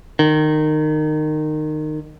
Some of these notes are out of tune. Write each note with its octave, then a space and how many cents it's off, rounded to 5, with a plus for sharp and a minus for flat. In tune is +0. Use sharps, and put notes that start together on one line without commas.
D#3 -20